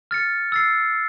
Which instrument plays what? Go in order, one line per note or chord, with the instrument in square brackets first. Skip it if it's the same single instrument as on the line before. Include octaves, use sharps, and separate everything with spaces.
[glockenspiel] F6 A6 C#7
E6 A6 C7